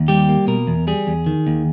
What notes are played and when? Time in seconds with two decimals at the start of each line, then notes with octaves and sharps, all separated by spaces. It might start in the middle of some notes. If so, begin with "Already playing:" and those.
Already playing: D#2
0.08 G3 G4
0.29 A#3
0.47 B2 A#4
0.67 E2
0.87 G3 G#4
1.07 E2
1.26 D#3
1.47 D#2